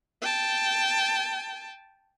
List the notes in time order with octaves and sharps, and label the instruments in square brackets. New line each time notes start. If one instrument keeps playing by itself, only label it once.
[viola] G5 A5